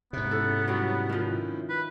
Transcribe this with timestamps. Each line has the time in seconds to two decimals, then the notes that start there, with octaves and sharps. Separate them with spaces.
0.13 G#2 C3 B3
0.31 C#4 E4 A4
0.68 F#3 G3
1.09 D#3 F3
1.69 B4